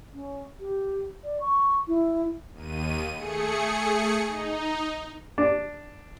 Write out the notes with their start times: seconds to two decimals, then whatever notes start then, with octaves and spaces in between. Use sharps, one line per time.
0.13 C#4
0.60 G4
1.23 D5
1.40 C#6
1.87 E4
2.53 D#2 D#7
3.16 A3 G#4 C#7
4.26 D#4
5.38 D4